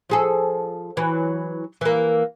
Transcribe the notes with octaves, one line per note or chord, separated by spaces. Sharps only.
F3 G#4 A4
E3 F#3
E3 A#3